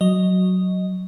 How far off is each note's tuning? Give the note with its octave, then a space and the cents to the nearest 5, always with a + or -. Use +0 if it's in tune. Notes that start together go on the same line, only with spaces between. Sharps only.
F#3 +0 D#5 +0